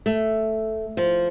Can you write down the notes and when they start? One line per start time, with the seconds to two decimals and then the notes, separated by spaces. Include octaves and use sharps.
0.06 A3
0.97 F3